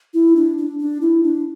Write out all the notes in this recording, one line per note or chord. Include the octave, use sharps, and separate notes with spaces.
E4
D4
D4
D4
E4
D4